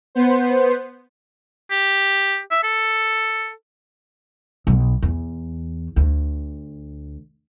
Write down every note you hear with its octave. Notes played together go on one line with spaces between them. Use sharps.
B3 C5
G4
E5
A4
B1
E2
D2